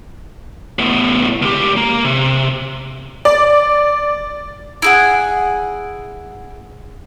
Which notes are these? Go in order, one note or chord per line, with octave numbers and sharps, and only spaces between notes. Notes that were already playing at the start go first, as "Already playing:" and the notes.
A2 B3
C#2 G4
A#3 A#5
C3
D5
E4 G#4 F#5